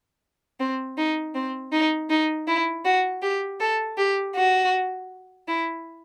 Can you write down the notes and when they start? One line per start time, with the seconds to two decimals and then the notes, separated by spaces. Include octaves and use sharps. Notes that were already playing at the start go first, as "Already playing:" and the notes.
0.60 C4
0.97 D#4
1.35 C4
1.72 D#4
2.10 D#4
2.47 E4
2.85 F#4
3.22 G4
3.60 A4
3.98 G4
4.35 F#4
5.48 E4